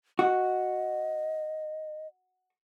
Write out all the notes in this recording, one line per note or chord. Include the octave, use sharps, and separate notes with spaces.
F#4 D#5